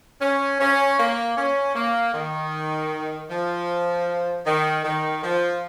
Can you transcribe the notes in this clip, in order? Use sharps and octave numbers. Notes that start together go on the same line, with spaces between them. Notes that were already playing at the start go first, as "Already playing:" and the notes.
C#4
C#4
A#3
C#4
A#3
D#3
F3
D#3
D#3
F3